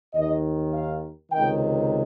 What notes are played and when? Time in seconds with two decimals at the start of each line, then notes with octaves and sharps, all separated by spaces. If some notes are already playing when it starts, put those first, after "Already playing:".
0.13 D#2 D#3 D#5
0.73 F5
1.31 C#2 C3 D#3 G5